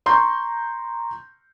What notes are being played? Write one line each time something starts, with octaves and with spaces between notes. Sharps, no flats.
A#5 C6 C#6 G6